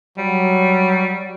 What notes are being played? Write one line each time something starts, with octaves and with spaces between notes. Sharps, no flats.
F#3 G3